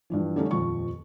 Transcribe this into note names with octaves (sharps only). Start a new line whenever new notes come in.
G2 E3 F3
D3 G3 A3 C#4 D#4
D#1 F2 F3 C#6